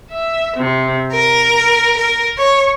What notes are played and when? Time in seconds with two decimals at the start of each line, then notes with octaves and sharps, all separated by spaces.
0.11 E5
0.58 C3
1.12 A#4
1.97 A#4
2.37 C#5